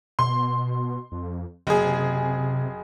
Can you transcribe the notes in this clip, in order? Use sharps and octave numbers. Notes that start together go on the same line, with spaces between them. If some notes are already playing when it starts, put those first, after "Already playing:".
B2 C6
F2
F#1 C3 G#4